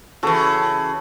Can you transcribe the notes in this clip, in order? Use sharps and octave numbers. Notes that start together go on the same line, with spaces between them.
C#3 E3 F#4 A4 C#5